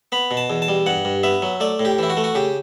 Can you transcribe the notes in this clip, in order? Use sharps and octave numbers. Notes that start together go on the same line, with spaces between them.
B3 B5
B2
A5
E2
A5
G3
G2 F#5
G2
B3 E5
F#3
A3 D5
A2
G4
E3 E4
F#4
A3
F#4
C#3 G4